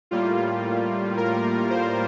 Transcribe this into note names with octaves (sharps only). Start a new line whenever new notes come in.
A2 G3 A#3 F4
A#4
C5